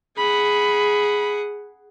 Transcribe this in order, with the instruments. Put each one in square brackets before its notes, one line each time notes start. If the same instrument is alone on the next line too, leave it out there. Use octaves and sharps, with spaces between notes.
[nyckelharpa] G#4 F#5 [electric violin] B5